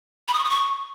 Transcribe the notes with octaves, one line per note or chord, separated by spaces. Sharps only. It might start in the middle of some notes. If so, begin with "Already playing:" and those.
B5
D#6
C#6
D#6
C#6